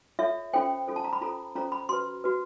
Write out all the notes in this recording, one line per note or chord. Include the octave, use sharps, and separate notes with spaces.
F4 A4 C#5 E5
C#4 F4 A4 C5 G5
C#4 F4 A4 C5
A5
A#5
B5
C#4 F4 A4 C5 A#5
C#4 F4 A4 C5 A#5
B5
F#4 B4 C6
F#4 B4